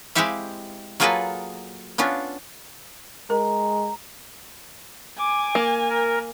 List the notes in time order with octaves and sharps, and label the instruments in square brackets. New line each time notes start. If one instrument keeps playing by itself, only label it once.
[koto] G#3 C4 E4 G4 E5 F5
F#3 A#3 F4 G#4 A4 B4
B3 C#4 D4 F4
[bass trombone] G#3 [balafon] A#4 [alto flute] A#5
[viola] G#5 [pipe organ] D6
[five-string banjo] A#3
[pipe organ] A#4